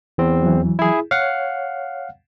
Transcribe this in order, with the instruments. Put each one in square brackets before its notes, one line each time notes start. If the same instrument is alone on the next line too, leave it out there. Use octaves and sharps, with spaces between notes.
[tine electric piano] E2 C4
[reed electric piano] E3 F#3
[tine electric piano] E4 G#4
[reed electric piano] C#5 [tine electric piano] F5 F#5